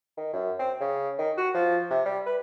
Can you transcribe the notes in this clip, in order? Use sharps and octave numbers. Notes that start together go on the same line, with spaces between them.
D#3
F#2
C4
C#3
D#3
F#4
F3
C3
G3
B4